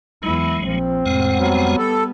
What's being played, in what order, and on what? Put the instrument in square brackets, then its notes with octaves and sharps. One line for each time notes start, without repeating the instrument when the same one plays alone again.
[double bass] E2 E4 [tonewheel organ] F#3 G#3
[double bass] A#1 F3 [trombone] C4
[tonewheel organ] F2 G#3 F#5 [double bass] A2 C3
[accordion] F#3 [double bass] G3 B3
[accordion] A4